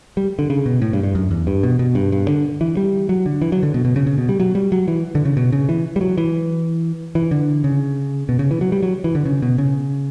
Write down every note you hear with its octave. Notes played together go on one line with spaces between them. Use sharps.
G3
D3
C#3
B2
A2
G2
G2
F#2
E2
G2
B2
B2
G2
G2
D3
E3
G3
F#3
D3
E3
F#3
D3
B2
B2
C#3
C#3
B2
G3
F#3
G3
F#3
E3
D3
C#3
B2
C#3
E3
G3
F#3
E3
E3
D3
C#3
B2
C#3
E3
F#3
G3
F#3
E3
D3
C#3
B2
C#3